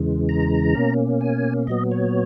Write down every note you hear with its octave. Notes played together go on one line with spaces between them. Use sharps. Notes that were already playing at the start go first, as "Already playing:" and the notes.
Already playing: E2 C#3 E3 G#3
A#5
B2 A#3 C#4
G#5
A#2 F#3 B3 D#5
C#5